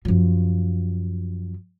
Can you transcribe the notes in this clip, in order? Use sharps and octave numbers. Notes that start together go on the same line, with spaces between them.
F#2 F3